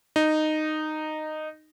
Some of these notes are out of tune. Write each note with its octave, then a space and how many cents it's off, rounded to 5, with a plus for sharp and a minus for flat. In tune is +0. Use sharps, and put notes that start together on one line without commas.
D#4 -10